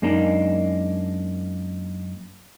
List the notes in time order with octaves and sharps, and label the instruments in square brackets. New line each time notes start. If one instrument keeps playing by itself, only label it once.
[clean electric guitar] F#2 G#3 A#3 D4 D#4